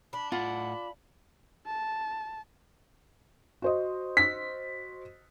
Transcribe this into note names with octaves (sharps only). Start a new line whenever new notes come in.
D4 B5
A2 F4 F#5 B5
A5
F#4 C5 D#5
B6